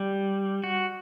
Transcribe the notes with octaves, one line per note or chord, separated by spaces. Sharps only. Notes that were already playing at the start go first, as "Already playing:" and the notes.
Already playing: G3
F#4